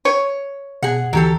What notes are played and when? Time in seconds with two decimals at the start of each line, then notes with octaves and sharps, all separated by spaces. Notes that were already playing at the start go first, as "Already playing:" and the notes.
0.05 C#5
0.83 B2 G#4 F#5
1.13 D2 E3 F#3 G4 A4